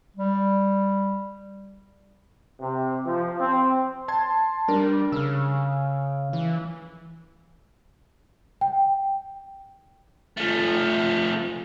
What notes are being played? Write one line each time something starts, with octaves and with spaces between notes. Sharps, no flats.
G3
C3
F3
C4
A5 C6 G#6
G3 D4 A#4
C#3 E6 F6
E3
G5
F3 A3